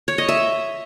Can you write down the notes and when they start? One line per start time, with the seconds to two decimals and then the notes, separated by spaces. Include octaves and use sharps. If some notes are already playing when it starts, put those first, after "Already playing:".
0.08 C#5
0.18 D#5
0.28 E5